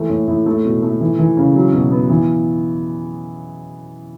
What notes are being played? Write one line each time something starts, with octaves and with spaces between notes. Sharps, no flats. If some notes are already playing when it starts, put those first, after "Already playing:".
Already playing: E3 A3
A2
A2
A3
B2
A3
E3
E3
C#3
F#3
B2
B3
E3